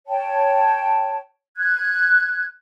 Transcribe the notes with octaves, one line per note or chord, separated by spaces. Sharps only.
C#5 G5 A5
F#6 G#6